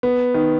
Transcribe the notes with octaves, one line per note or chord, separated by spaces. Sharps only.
B3
D#3